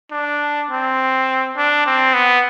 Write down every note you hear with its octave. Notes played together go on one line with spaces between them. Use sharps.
D4
C4
D4
C4
B3